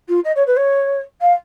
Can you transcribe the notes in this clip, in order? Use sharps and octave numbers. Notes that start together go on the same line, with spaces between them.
F4
D#5
C#5
B4
C#5
F5